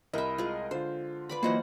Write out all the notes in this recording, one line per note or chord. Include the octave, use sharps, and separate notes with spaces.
C2 E4 A#4 D#5 E5
G#3 F4
D3 F4 C5
B4 D5 B5
E3 F#3 A#3 F4 C5 C#5 D#5 F#5